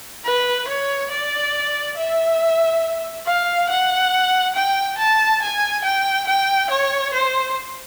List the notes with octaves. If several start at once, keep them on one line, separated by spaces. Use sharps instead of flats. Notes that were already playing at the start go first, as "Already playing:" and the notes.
B4
C#5
D5
E5
F5
F#5
G5
A5
G#5
G5
G5
C#5
C5